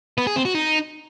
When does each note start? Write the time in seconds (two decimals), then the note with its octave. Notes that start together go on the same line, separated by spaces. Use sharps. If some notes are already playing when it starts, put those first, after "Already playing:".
0.18 B3
0.27 G#4
0.36 C4
0.45 F#4
0.55 D#4